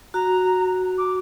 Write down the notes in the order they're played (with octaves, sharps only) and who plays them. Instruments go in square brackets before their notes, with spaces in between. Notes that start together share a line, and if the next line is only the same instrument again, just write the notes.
[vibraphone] F#4 [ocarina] A#5
[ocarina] D6